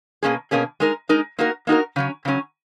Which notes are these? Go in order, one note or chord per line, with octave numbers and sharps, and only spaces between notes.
B2 A#3 C#4 G#4
B2 A#3 C#4 G#4
G#3 D#4 A#4
G#3 D#4 A#4
A#3 D#4 F#4 A#4
A#3 D#4 F#4 A#4
C#3 F#3 C#4
C#3 F#3 C#4